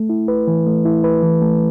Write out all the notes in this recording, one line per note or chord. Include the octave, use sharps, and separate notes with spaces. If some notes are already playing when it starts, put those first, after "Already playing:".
Already playing: A3
E4
B4
E3
A3
E4
B4
E3
A3